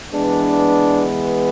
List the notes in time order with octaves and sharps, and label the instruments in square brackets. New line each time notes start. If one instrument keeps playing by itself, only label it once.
[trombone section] E3 G#3 B3 D4